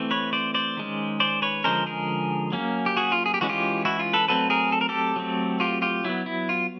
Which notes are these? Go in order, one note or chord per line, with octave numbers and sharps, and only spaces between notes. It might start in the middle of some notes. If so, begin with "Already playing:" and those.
Already playing: E3 A3 C4
B4 C#5
C5 D5
C5 D5
D#3 G#3 C#4
C5 D5
B4 C#5
D3 F3 G#3 C#4 A#4 C5
G#4 A#4
F#3 A#3 C#4
G4
F#4 G#4
F4
G#4
G4
E3 G#3 C#4 F#4
F4 G4
E4 F#4
F4
A4 B4
F#3 A3 C4 A4 B4
G#4 A#4
A4
A#4
G4 A4
F#3 A3 C4
F4 G4
F4 G4
F#3 B3 E4
E4
F4